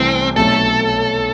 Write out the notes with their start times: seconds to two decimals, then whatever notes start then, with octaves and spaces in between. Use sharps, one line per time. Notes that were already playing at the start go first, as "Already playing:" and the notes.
Already playing: C2 C3 E3 A3 C4
0.35 B1 B2 A3 C4 A4